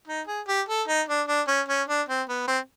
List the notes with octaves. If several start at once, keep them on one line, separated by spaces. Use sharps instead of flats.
D#4
G#4
G4
A4
D#4
D4
D4
C#4
C#4
D4
C4
B3
C4